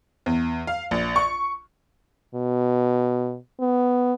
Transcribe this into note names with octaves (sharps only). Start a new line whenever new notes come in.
E2
F5
A#1
C#6
B2
B3